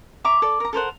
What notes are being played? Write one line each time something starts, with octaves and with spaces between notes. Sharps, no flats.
E5 A#5 C#6 D6
A4 D5
A#4 A#5
A4 A#4 C5 F#5